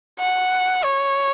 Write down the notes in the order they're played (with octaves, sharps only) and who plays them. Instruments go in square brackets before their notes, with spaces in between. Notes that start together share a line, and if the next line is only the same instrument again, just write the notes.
[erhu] F#5
C#5